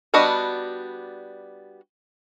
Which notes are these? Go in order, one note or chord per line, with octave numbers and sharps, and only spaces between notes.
G3 B3 D4 F#4 D#5